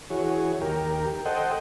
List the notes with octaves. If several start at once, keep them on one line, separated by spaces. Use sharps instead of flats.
E3 F#4 G#4 C#5
D#2 G4 A#4
A4 C5 D#5 F#5 G5